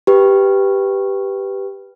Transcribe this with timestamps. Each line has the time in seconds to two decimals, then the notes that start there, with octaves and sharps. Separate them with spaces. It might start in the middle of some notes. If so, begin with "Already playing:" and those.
0.07 G4 B4